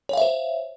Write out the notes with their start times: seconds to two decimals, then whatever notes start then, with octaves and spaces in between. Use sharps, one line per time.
0.09 C#5
0.13 F5
0.17 E5
0.22 C5